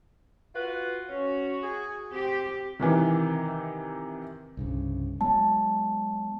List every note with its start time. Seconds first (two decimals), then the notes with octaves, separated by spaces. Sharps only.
0.53 F4 F#4 B4
1.08 C#4 F#4
1.61 G#4
2.12 C4 G4
2.79 C3 D#3 E3
4.57 C2 G2 C#3
5.21 F#3 G#3 B3 A5